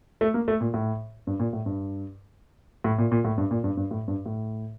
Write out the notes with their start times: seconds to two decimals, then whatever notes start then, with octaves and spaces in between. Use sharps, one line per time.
0.21 A3
0.34 A#3
0.48 A3
0.61 A#2
0.74 A2
1.27 G2
1.40 A#2
1.53 A2
1.66 G2
2.84 A2
2.98 A#2
3.12 A#2
3.25 A2
3.38 G2
3.51 A#2
3.64 G2
3.77 G2
3.91 A2
4.08 G2
4.26 A2